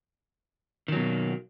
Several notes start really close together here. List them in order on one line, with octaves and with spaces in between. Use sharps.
D#3 F#3 B2 A#3